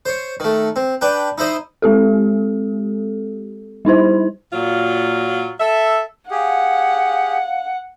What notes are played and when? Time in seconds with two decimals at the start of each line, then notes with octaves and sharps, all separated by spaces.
0.06 C5 C#5
0.40 D#3 A3
0.76 C4
1.01 D4 B4 G5
1.38 D#4 E4 C5 D#5
1.82 G#3 C4 G4 A4
3.85 G3 D#4 E4 C5
4.52 A#2 F#3 F4
5.60 A4 E5
6.31 G4 G#4 F5 F#5